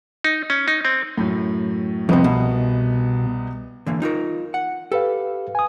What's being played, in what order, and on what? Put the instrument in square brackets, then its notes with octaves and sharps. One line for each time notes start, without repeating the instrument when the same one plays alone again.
[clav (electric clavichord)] D#4
C#4
D#4
C4
[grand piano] F#2 A2
[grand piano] C2 B3 D#5 [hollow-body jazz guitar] F2 C3
[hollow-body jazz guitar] B2
D3 E3 A#3
D#4 F4 A#4
F#5
[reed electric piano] G4 B4 F5 [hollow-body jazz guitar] A4
[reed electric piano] G#5 D#6